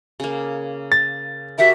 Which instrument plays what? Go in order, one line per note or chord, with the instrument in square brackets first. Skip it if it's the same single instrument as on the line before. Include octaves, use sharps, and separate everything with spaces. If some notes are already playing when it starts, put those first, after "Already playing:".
[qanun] C#3 A#3
[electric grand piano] A6
[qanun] F#4 G4 A#4 [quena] E5